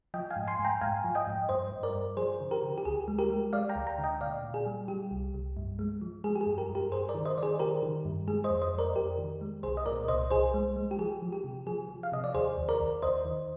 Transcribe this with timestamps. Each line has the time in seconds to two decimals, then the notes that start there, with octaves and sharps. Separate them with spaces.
0.14 F3 D#5 G5
0.31 F5 G#5
0.36 G#2
0.48 G#5 C6
0.59 G#2
0.65 G5 A#5
0.81 G#2 F5 G#5
1.04 F3
1.15 D#5 G5
1.27 G#2
1.49 G2 C5 D#5
1.72 G2
1.83 A#4 D5
1.94 G2
2.17 F3 G#4 C5
2.40 D3
2.51 G4 A#4
2.63 D3
2.78 G4
2.85 D2 G#4
3.08 G#3
3.19 G4 A#4
3.30 G#3
3.53 G#3 D5 F5
3.69 G5 A#5
3.75 D2
3.87 G5 A#5
3.99 D3
4.04 D#5 G5
4.21 A#2 D5 F5
4.43 A#2
4.54 G#4
4.66 G3
4.88 G3 G4
5.11 C2
5.34 C2
5.57 G2
5.79 G#3
6.01 F3
6.24 G#3 G#4
6.36 G4
6.41 G#4
6.46 G2
6.58 G4 A#4
6.69 G2
6.75 G4 A#4
6.92 G2 G#4 C5
7.09 A#4 D5
7.15 D#3
7.26 C5 D#5
7.38 D#3 D5
7.43 G#4 C5
7.59 D#3 G4 A#4
7.82 D#3
8.05 G2
8.28 G#3 G#4
8.44 C5 D#5
8.50 F2
8.62 C5 D#5
8.73 F2
8.78 A#4 D5
8.95 F2 G4 A#4
9.18 D#3
9.41 G#3
9.63 C2 G#4 C5
9.77 D#5
9.86 A#2 A#4 D5
10.08 C2 C5 D#5
10.31 C2 G#4 C5
10.54 G#3
10.76 G#3
10.91 G4
10.99 F3 G#4
11.22 F3
11.33 G4
11.44 C3
11.67 F3 G#4
11.89 F3
12.03 F5
12.12 C3 D#5
12.24 D5
12.35 D#2 G#4 C5
12.58 D#2
12.69 A#4 D5
12.80 D#2
13.02 D#2 C5 D#5
13.25 D#3